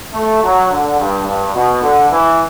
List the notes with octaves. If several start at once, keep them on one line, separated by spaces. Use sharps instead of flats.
A3
F#3
D3
G2
G2
B2
D3
E3